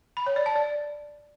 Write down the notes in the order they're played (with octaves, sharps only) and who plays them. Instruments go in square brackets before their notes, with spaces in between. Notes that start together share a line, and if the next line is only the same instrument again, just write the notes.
[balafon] B5
C#5
D5
A5
D5